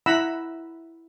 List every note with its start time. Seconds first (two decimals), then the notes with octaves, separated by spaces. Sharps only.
0.06 E4 F#5 A#5 B5 E6